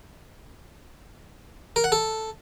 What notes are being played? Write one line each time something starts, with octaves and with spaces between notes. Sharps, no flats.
A#4
F#5
A4